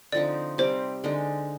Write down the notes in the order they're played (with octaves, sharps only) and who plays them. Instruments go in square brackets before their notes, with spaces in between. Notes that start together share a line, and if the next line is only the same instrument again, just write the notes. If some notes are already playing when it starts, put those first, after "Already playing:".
[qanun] D3 F3 C4 D#4 [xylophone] D5
[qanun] C3 G3 C4 G4 [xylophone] C5
[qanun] D3 G#3 D#4